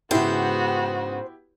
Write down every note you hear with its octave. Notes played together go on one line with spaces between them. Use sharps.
G#2 C#3 B3 E4 F#4 G4 C5